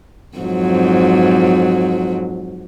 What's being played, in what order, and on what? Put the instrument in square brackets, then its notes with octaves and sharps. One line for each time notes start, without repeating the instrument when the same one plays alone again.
[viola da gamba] F2 G#2 F#3